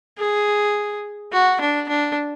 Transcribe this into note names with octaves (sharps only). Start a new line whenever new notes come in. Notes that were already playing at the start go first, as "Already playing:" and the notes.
G#4
F#4
D4
D4